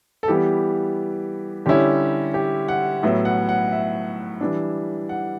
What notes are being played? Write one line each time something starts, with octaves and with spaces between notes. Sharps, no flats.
A4
E3 G3 B3 G4
D3 G3 C#4 E4 G4
G4
F#5
A2 F#3 B3 E4 E5
F#5
F#5
E5
E3 G3 D4
F#5